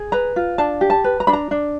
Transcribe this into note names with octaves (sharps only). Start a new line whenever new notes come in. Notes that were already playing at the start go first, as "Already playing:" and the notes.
Already playing: G#4
B4 A#5
F4
D4 A5
G4
A5
B4
A#5
D4 B5
A#5
D4